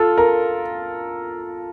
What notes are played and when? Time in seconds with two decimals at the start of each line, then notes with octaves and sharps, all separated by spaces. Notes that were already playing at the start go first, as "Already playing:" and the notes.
Already playing: F4 A4
0.18 A#4